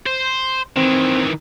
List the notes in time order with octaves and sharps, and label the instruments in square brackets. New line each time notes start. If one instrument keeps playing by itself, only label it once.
[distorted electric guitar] C5
[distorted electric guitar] D#3 E3 [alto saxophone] C4